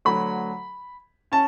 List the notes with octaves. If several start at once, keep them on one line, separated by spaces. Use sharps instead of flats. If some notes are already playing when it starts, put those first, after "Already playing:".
D2 D3 F#3 B5
C#4 A5